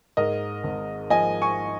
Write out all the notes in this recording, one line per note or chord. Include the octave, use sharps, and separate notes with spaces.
G#2 A#4 D#5
G#1
F3 D#5 G#5
G#5 C#6